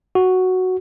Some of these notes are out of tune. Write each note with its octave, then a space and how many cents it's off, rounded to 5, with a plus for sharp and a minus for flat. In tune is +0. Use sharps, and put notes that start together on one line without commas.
F#4 +0